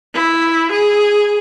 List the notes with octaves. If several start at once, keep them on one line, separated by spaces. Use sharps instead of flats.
E4
G#4